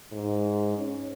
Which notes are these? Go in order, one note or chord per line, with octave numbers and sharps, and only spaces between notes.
G#2
C#4